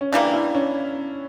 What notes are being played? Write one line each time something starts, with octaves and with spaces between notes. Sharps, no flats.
C#4
C#3 E3 G3 A#3 D4
E4
C#4